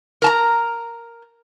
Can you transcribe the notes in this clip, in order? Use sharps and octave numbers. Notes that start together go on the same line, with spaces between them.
A#4 A5 A#5